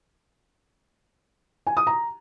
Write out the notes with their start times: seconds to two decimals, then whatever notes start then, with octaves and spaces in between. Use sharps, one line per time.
1.67 G#5
1.77 D#6
1.87 A#5